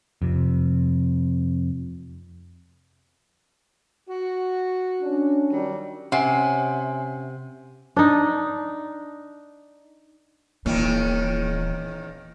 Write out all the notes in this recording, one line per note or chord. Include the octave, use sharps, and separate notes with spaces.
F2 C3
F#4
C#4 D4
D#3 F#3 G3
C3 C#4 C#5 E5 F#5 G#5 C6 C7
D4 D#4
D#1 E2 A#2 D#3 C#4